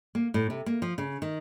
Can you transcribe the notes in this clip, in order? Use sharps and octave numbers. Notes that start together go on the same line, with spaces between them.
A#3
A2
C3
A#3
F3
C#3
D#3